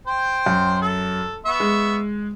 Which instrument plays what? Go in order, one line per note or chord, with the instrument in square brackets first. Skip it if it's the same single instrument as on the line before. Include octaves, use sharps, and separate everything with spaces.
[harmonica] C5 G5
[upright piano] F#2
[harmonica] A4
B3 E5 C#6
[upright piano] G#3